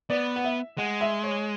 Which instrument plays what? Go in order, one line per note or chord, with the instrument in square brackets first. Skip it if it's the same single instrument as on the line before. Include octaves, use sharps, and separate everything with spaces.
[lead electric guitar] B3 [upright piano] D5
[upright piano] F#5
E5
[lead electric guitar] G#3 [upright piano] F#5
[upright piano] E5
C#5